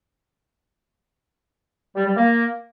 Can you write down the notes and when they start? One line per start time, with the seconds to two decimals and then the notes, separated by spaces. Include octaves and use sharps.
1.96 G3
2.06 G3
2.16 A#3